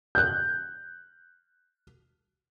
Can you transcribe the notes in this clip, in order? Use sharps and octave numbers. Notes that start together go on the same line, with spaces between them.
F#6 G6